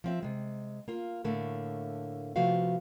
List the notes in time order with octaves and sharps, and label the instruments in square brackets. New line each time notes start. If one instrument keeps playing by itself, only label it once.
[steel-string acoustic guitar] F3 C4 E5
C3 G#3
A#3 F4
A2 D3 A3 A#3
C3 F3 A3 B3 F#4 F5